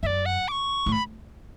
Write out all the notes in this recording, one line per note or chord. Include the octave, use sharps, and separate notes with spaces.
F#2 D5 E5
F#5
D6
C#6
A2
B5